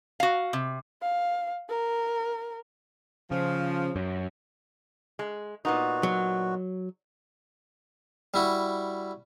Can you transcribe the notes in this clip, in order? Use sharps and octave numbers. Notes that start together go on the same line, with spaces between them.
F#4 F5
C3
F5
A#4
C#3 F3
F#2
G#3
A#2 B3 D#4 F#4
F#3
G3 E4 F#4